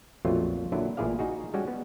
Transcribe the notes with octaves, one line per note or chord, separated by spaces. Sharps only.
A#1 F2 B2 F#3 A3 F4
A#2 D3 F#3 D4 E4
A1 A#2 E4 G#4 D5 F5
D#4 F#4 G#4
G3 G#3 C#4 F#4
B3